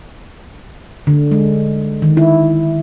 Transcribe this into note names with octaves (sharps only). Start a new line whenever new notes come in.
D3
G#3
D#3
E4